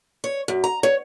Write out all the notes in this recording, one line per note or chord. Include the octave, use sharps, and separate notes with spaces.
C#5
F#2
A#5
C#5